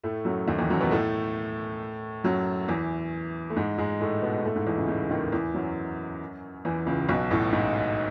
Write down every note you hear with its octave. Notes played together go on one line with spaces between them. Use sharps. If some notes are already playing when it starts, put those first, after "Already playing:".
A2 A3
F#2 F#3
D#2 D#3
E2 E3
F#2 F#3
B2 B3
A2 A3
F#2 F#3
E2 E3
A3
G#2 G#3
G#2 G#3
A2 A3
B2 B3
G#3
A2 A3
G#2 G#3
E2 E3
C#2 C#3
C#2 C#3
D#2 D#3
E2 E3
F#2 F#3
E2 E3
C#2 C#3
B1 B2
A1 A2
G#2